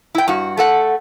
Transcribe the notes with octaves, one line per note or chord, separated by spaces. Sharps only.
E4 G5
G2 F#4
A3 A4 F#5